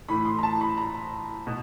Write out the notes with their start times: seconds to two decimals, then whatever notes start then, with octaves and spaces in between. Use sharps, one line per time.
0.08 A2 E3 B5
0.25 C6
0.39 A#5
0.43 A5
0.61 B5
0.78 A#5
1.47 B2